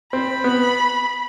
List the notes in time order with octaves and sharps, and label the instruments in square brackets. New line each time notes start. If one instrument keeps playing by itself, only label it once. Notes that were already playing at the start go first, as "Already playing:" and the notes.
[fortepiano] C4 [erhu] B5
[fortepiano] B3